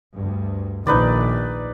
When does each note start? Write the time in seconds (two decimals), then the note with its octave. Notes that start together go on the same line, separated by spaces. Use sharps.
0.15 D2 G2
0.87 A#1 D#3 D#4 B4 D5